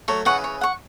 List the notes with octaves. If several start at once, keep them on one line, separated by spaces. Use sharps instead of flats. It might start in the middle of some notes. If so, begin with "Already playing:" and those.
F#3 A3 C#5
C#3 E3 F#5 C#6
C#5
F#5 C#6